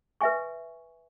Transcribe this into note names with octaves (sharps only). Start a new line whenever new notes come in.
B4 E5 G#5 C#6